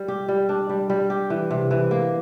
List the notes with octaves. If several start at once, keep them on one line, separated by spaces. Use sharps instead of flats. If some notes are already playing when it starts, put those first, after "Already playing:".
Already playing: G3
G4
G3
D4
G3
G3
G4
E3
C3
E3
A#3